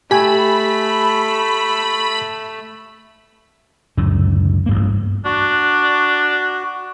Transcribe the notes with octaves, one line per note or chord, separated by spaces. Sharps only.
A3 G4 G#5 B5
C#2 F#2 A2 D3
A1 G2 A#3
D4 F#4